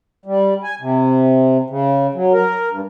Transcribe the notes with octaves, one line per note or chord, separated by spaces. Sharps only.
G3
G#5
C3
C#3
F#3
A#4
G2